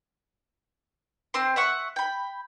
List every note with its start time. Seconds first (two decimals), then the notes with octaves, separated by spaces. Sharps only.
1.34 C4 C5 C6
1.56 E5 F#5 C#6
1.96 G5 B5